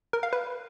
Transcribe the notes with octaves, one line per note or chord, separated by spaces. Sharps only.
A#4
F5
B4